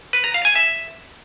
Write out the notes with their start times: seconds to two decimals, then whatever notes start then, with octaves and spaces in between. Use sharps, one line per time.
0.13 B4
0.24 A#5
0.34 F5
0.45 G#5
0.56 E5